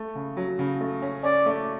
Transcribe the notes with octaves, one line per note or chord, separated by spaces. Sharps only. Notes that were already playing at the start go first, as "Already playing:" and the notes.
Already playing: A3
C#3
F#3
C#3
A3
C#4
C#4 D5
A3